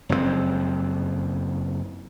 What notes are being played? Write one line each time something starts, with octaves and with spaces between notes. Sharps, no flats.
F#1 F2 G#2 C4